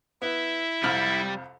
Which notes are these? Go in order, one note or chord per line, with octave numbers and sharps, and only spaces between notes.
B3 E4 E5
C2 F2 G3 F6